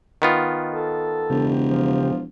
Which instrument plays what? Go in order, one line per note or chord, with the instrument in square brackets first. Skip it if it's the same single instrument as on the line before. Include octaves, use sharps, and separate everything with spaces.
[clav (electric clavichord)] D#3 B3 F4
[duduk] A4
[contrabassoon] E1 [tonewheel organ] C#3 G4
[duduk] F3